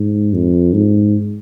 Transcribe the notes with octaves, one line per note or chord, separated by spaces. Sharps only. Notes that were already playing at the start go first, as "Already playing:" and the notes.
Already playing: G#2
F2
G#2